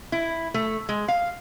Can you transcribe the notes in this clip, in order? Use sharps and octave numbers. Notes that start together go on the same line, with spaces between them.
E4
A3
G#3
F5